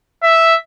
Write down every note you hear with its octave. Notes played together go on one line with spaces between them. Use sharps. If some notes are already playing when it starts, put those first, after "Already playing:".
E5